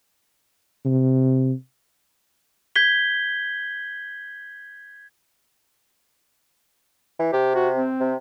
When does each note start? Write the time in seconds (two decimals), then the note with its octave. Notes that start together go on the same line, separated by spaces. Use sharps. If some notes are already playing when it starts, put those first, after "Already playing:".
0.85 C3
2.75 G6 G#6 B6 G7
7.19 E3
7.33 C3 G4
7.55 F#4
7.76 C4
8.00 C3